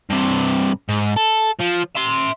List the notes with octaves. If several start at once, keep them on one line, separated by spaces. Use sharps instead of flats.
G2 C3
G#2
A4
F3
E5 C6